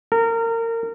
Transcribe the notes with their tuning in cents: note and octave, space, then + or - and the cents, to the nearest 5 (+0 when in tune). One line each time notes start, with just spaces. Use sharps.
A#4 -25